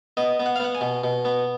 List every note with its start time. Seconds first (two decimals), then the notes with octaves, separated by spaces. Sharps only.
0.17 B3 D#5
0.40 B3
0.46 F#5
0.56 F5
0.60 B3 F#5
0.75 G#5
0.81 B2
1.04 B2
1.25 B3